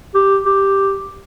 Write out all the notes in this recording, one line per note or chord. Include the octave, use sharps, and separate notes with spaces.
G4
G4